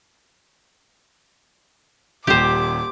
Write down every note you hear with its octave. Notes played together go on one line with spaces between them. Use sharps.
D#1 G4 C5 D6